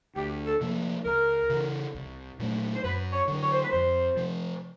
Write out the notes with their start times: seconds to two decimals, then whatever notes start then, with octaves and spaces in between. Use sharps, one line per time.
0.15 D2 G4
0.45 A4
0.61 C3 F3 A#3
1.05 C#2 A#4
1.50 C#3 E3
1.95 C2
2.39 A#2 F#3 A3
2.75 C5
2.84 F#2 B4
3.13 C#5
3.28 D3 F#3
3.43 C#5
3.52 C5
3.62 B4
3.70 F2 C5
4.17 C3 F3